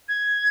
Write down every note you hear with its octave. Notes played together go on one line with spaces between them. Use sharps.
G#6